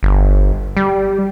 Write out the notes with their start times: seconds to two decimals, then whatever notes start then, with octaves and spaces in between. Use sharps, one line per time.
0.03 G1
0.77 G3